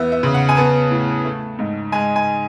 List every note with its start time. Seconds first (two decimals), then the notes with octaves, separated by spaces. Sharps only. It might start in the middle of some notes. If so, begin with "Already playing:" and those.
Already playing: E2 B3 E5
0.12 E5
0.23 C#3
0.34 F#5
0.49 G#5
0.57 B3 A5
0.91 A2
1.25 A3
1.59 G#2
1.92 G#3 G#5
2.16 G#5